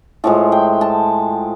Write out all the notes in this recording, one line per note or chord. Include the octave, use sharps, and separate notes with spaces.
A2 F3 G#3 A5
G5
A5